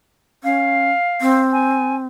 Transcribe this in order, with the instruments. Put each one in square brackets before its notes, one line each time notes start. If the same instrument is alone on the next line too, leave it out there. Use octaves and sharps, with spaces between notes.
[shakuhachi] C#4 [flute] F5
[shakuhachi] C4
[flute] G#5